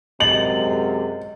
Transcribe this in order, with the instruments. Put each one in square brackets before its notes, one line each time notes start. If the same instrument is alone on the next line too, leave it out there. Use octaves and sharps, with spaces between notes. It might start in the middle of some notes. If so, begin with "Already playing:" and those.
[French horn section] F#2 C3 G#3 [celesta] D#5 A6 [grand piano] F#7